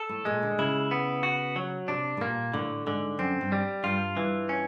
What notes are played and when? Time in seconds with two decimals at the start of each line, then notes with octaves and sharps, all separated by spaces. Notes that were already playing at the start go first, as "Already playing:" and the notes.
Already playing: A4
0.09 A2
0.25 A#2 G#3
0.43 D3
0.59 C#3 E4
0.91 B3
1.23 F#4
1.56 F#3
1.88 C3 D4
2.17 A2
2.21 A#2 A#3
2.53 A2 D3
2.87 G#2 D3
3.19 F#2 C4
3.41 G2
3.52 G3
3.83 G2 F4
4.17 G2 E3
4.49 C#4